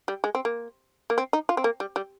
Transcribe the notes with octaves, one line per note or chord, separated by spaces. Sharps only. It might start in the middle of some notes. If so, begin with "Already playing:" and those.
G3
G#3
C4
A#3
A#3
C4
D#4
F4
C4
A#3
G3
G3